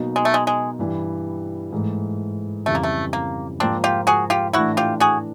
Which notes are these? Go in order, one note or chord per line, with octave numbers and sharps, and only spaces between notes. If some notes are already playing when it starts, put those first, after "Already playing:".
Already playing: B2 F#3 A#3 D#4
G#3
A3
G#3
G#3
G2 E3 G3
G#2 E3 A3
F2 C#3 E3 G3 A3
A#3
A3
A#3
G#2 F3 A#3 C4 D4
F4 G4
F#4 G#4
F4 G4
A2 E3 A3 D4 E4 F#4
F4 G4
F#4 G#4